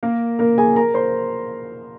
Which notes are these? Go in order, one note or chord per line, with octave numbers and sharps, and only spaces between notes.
A#3 A#4
A#3 A#4
G#4 G#5
A#4 A#5
C5 C6